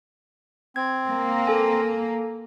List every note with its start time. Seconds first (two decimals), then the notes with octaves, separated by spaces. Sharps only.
0.76 C4 G#6
1.09 A#3
1.47 A4 G#5